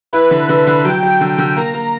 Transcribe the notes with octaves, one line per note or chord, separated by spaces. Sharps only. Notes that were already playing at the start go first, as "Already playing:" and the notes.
E4 B4
D3
D3
D3
F#3 G5
F#3
D3
D3
A#3 A#5
A#3